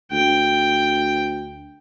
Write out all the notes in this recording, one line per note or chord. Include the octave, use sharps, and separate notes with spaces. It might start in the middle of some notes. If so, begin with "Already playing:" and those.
D2 G5